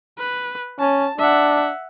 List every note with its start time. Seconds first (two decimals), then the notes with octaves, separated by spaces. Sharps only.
0.18 B4
0.80 C#4 A5
1.19 D4 E5 F#5